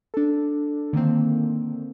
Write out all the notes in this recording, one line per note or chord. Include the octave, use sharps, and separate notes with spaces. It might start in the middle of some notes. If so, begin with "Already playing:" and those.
D4 A4
D3 D#3 A#3 C4